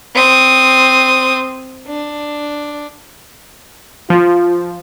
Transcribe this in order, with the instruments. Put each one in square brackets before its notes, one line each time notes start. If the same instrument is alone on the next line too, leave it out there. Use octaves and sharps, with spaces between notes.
[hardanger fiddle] C4 D#6
D4
[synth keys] F3 [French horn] F4